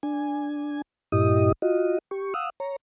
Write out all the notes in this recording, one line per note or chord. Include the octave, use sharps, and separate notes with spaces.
D4 G#5
G2 A#2 E4 G4 D#5 D#6
F4 F#4 D#5
G4 C#6
F5 F#5 D#6 E6
C#5 A#5